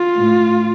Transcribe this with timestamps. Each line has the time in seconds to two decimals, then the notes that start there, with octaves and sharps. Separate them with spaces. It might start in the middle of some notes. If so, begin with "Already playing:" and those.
Already playing: F4
0.16 A2